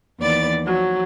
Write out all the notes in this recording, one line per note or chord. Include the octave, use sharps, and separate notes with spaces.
D#2 E3 B3 D5 A6
F3 F#3